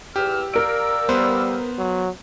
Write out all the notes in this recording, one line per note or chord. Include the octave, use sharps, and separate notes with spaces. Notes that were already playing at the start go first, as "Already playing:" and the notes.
E2 G4 E6 F6
A#4 D5 F5 E6 D7
G3 B3 B4 C5
F#3